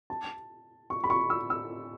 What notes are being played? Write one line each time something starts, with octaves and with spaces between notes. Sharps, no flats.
A5
C#6
B5
C#6
E6
E6